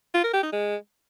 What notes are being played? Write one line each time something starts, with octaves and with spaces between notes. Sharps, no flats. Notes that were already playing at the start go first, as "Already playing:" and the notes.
F4
A#4
G4
D#4
G#3